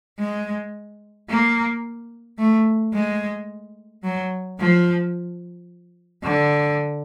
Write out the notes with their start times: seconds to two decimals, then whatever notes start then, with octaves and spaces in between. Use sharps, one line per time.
0.19 G#3
1.29 A#3
2.38 A3
2.93 G#3
4.03 F#3
4.59 F3
6.23 D3